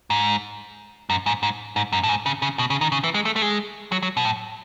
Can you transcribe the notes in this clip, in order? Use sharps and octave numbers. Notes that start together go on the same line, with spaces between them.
G#2
F#2
G#2
G#2
G#2
F#2
A2
G#2
C#3
C#3
B2
C#3
D#3
C#3
E3
G#3
A3
A3
G#3
F#3
F#3
B2
A2